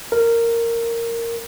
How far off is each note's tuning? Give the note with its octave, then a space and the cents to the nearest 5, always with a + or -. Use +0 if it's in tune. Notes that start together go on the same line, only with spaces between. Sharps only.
A#4 -10